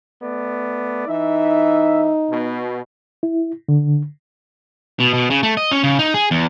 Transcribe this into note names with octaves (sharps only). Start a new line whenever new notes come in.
A3 B3 D5
E3 D#4 E5
B2
E4
D3
B2
B2
C#3
A3
D#5
C#4
C#3
D#4
G#4
E2